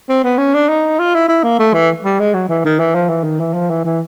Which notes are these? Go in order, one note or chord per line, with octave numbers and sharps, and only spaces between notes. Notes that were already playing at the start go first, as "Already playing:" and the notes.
C4
B3
C#4
D4
D#4
F4
E4
E4
A#3
A3
E3
G3
G#3
F#3
E3
D#3
E3
F3
E3
D#3
E3
F3
E3
E3